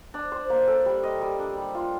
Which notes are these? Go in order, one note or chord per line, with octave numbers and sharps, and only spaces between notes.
D4
C5
A#3
A4
G3
D#5
G3
D4
G3
F4